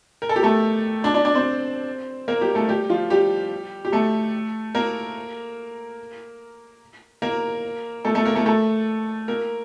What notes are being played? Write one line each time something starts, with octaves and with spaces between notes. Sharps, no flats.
A#4
A4
G4
A3 A4
D4 D5
D4 D5
D4 D5
C4 C5
A#3 A#4
G3 G4
A3 A4
G3 G4
F3 F4
G3 G4
G4
A3 A4
A#3 A#4
A#3 A#4
A3 A4
A3 A4
A#3 A#4
A3 A4
A3 A4
A#3 A#4